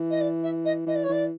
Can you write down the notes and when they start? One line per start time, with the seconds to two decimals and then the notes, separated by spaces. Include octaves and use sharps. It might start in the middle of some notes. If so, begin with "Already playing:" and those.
Already playing: E3
0.10 D#5
0.20 D5
0.43 E5
0.65 D#5
0.86 E3 D#5
0.95 D5
1.03 C#5
1.09 E3 D5